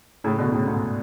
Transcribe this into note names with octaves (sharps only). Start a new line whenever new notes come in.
A2 C#3
B2 D3
A2 C#3
G#2 B2